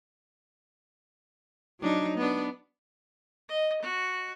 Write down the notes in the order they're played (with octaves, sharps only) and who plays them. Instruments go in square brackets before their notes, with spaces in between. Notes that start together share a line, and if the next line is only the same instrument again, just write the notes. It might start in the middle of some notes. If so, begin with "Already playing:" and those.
[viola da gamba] F#3 D4 D#4
B3 D4
[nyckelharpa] D#5
F#4